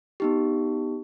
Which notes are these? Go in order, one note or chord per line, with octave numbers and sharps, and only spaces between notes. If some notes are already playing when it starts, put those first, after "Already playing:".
B3 D#4 G4